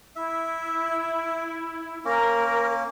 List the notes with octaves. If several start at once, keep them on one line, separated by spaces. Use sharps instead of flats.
E4 E5
A#3 C#4 A#4